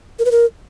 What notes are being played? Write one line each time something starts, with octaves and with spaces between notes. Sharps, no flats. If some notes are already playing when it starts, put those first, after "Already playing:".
A#4
B4
A#4